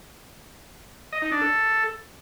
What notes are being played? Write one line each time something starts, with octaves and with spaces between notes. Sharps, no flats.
D#5
D#4
D4
A4